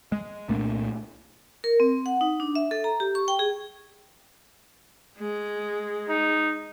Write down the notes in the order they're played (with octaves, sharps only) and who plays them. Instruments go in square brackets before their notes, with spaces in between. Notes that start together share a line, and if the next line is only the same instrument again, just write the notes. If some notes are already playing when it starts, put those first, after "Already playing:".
[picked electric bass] G#3
C2 A#2 A3 D4
[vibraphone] A#4
C4
F#5
D#4
D4
E5
A4
A#5
G4
C#6
G5
G#4
[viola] G#3
[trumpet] D#4